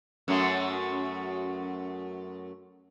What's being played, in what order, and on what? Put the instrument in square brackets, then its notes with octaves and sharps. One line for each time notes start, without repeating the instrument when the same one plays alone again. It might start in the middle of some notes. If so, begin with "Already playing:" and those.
[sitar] F#2 F#3 A3